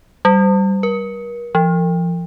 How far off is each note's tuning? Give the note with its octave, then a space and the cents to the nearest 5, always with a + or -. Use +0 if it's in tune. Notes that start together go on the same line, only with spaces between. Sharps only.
G3 -15
A#4 +40
F3 -35